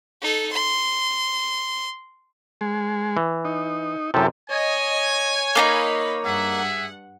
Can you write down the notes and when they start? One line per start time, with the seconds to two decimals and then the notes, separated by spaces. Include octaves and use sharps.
0.22 D#4 A4
0.52 C6
2.61 G#3
3.17 E3
3.45 D#4
4.14 F#2 C3 E4 G4 A4
4.50 C#5 D#5 G#5
5.55 A#3 D4 D#4 D#5 F5 B5
6.25 G2 G#4 E5 F#5